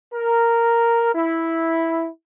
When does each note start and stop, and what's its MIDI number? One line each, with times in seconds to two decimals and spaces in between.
0.13 1.14 70
1.15 2.08 64